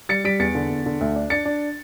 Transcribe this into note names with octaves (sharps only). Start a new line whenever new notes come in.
G3 A6 C#7
G3 B6 D7
E2 A6 C#7
D3
E2
D3
D2
D4
D4 A6 C#7
D4